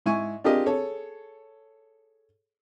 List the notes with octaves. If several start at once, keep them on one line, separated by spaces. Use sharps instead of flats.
G#2 E4 G#5 C#6
D4 F4 G4 G#4 A#4 D#5
G#4 A4 C#5